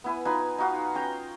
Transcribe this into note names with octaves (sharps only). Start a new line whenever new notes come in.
B3 E4 G#5
D#4 F4 B4 G#5
D#4 F4 F#4 F5
C#4 G5 A#5